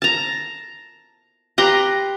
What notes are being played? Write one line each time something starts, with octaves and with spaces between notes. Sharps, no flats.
A5 A#5
G4 B4 A#5 C6